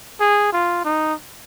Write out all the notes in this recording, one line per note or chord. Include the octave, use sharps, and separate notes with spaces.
G#4
F4
D#4